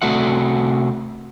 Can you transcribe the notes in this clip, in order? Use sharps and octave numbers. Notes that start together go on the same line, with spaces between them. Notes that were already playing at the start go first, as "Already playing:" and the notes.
C3 A3 F#4 E5 F#5